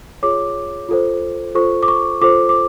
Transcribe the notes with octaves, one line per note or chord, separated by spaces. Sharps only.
F4 G#4 C#5 D6
F4 A4 C5
F4 A4 C5 C#6
D6
C#6
F4 A4 C5 D6
D6